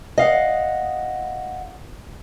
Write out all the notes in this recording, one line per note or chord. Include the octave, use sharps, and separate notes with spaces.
D#5 F5 F#5